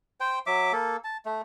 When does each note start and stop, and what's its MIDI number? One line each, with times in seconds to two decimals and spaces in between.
0.20 0.39 72
0.20 0.39 79
0.46 0.73 54
0.46 0.73 76
0.46 0.73 86
0.73 0.97 58
0.73 0.97 69
1.04 1.17 81
1.25 1.42 57